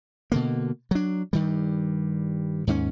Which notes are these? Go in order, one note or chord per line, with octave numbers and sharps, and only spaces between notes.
B2 D3 A#3
F#3 D4
G2 D#3 G3
D#2 G#2 G#3 C#4